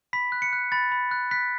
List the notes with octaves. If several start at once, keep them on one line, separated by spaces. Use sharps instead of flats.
B5 B6
F#6
C#7
F#6
B5 A6
B5
F#6
F#6 B6